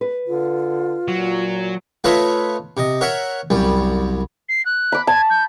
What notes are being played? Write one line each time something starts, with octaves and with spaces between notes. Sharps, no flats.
B4
D3 F4
A#2 F#3
A3 F4 B4 C#5 D#5 E5
C3 D#5
A#4 C#5 E5 F#5
C2 F#2 G3
C7
F#6
B5 D6
A5 G#6
G6